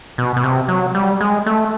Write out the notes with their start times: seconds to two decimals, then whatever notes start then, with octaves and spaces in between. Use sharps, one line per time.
0.18 B2
0.37 B2
0.43 C3
0.68 F#3
0.95 G3
1.21 G#3
1.46 A3